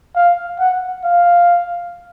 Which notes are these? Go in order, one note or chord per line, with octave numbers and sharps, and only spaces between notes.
F5
F#5
F5